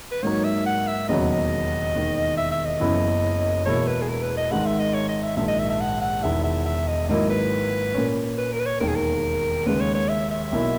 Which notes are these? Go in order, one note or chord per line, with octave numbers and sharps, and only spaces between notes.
B4
G#2 F#3 A#3 D#4 A#4 C#5
E5
F#5
E5
E1 D#2 C#3 F#3 B3 D#5
D#5
E1 D#2 D#3
E5
E5
D#5
F#1 F#2 E3 B3 E4
E1 E2 B2 A#3 E4 C#5
B4
G#4
A#4
B4
D#5
G#1 G#2 D#3 G#3 F#5
E5
D#5
C#5
D#5
E5
A#1 G#2 D#3 E5
D#5
E5
E5
F#5
F#5
E1 E2 D#3 E5
E5
E5
D#5
G#1 G#2 F#3 A#3 E4 D#5
B4
A#2 A#3 C#4
B4
A#4
B4
C#5
E1 D#2 D#3 A#4
G#4
A#4
D#2 C#3 G#3 B4
C#5
C#5
E5
E5
B1 B2 A#3 E4